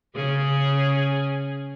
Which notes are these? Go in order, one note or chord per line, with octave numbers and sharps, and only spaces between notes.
C#3 C#4 G#4